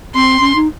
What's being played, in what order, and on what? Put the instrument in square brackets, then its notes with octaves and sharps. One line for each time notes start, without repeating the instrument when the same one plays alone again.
[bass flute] C4 [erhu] C6
[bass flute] C#4
D#4